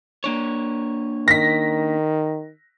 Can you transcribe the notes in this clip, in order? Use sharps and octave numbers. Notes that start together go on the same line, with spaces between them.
A#3 D4 C#5
D#3 A#6 B6